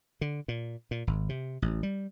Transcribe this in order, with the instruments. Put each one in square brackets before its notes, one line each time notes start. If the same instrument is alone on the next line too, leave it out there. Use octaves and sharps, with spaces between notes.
[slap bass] D3
A#2
A#2
G#1
C3
A1
G3